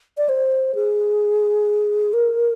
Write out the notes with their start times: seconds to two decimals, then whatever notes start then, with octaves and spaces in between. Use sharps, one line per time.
0.17 D5
0.29 C5
0.75 G#4
2.13 A#4